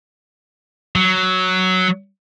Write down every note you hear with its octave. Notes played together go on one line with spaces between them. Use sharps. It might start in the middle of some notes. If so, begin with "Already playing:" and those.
F#3